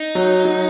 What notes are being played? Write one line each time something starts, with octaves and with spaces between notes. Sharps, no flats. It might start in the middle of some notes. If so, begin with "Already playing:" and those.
Already playing: D#4
F#3
F#3